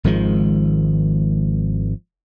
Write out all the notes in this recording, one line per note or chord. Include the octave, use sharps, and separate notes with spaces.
G#1 D#3 F3 G#3